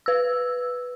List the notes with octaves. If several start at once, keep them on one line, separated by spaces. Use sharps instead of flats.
B4 E6